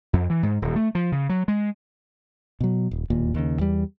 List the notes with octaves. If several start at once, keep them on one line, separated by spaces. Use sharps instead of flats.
F2
E3
G#2
D#1
A3
F3
C#3
F#3
G#3
B2 F#3
D#1
E1 D#2 A#2
D#2 C#3
E2 G3